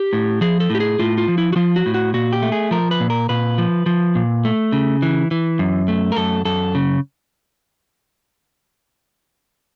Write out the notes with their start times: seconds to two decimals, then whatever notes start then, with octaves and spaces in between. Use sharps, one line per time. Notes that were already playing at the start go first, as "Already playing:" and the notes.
Already playing: G4
0.13 A2
0.41 F3 G#4
0.60 A4
0.70 A2 G4
0.80 G#4
0.99 A2 F4
1.18 F4
1.28 F3
1.38 E4
1.53 F#4
1.56 F3 F4
1.76 F#4
1.86 A2
1.94 F#4
2.14 A#2 F#4
2.33 G4
2.42 A3
2.52 G#4
2.71 F3 A#4
2.91 B4
3.00 A#2
3.10 A#4
3.29 A#2 B4
3.58 F3
3.86 F3
4.15 A#2
4.45 A3
4.72 C#3
5.02 E3
5.31 E3
5.59 F#2
5.88 A3
6.12 A#4
6.16 F#2 A4
6.45 F#2 A4
6.75 C#3